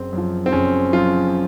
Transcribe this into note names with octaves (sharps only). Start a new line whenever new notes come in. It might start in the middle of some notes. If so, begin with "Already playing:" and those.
Already playing: F#1 C4
F#2 F3
C4
F#1 C#4
F#2 F3 F4